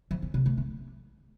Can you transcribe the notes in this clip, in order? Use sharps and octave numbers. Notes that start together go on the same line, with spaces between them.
F3
C#4
C3
A3
D4